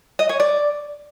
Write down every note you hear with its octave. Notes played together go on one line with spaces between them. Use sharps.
D#5
C#5
D5